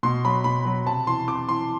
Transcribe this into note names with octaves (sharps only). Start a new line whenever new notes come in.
B2 C6
F#3 B5
B2 B5
F#3
C3 A5
E3 C6
C3 D6
E3 C6